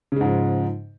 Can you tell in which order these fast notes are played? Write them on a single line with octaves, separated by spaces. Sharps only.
C#3 G#3 G#2 F3